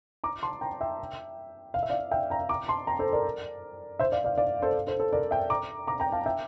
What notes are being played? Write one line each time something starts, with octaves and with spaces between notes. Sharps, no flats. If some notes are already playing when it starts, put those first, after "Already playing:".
A#5 D6
A5 C6
G5 A#5
E5 G5
F5
E5
D5 F5
E5 G5
G5 A#5
A#5 D6
A5 C6
G5 A#5
A4 C5
A#4 D5
C5 E5
D5 F5
D5 F5
D5 F5
A4 C5
A4 C5
A4 C5
A#4 D5
E5 G5
A#5 D6
A#5 D6
G5 A#5
F5 A5
E5 G5